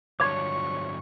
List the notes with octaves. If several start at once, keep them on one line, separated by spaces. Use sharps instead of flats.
G2 D3 F3 F#3 C#5 C#6 D6 G#6